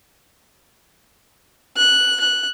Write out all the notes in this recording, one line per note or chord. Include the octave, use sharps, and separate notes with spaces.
F#6
F#6